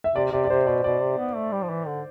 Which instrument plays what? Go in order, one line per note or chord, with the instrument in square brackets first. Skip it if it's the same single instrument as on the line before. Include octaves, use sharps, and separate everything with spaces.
[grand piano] E5
[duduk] C3 [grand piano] D5
[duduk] C3 [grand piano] D5
[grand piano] D5
[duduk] C3 [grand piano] C5
[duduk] B2 [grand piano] D5
[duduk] B2 [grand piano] D5
[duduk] C3
B3
A3
G3
F3
E3
D3